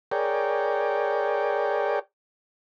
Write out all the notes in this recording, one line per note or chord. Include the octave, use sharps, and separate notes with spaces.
G#4 A#4 C#5 D5 G5